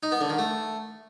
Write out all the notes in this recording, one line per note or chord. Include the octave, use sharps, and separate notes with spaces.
D#4
B3
D3
D#3
A3